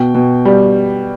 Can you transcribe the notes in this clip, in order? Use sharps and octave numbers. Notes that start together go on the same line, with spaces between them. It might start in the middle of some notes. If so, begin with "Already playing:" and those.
Already playing: B2 G5
B2
G3